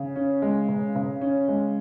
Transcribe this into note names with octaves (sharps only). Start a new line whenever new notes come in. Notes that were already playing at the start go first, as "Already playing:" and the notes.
Already playing: C#3
C#4
G#3
C#3
C#3
C#4
G#3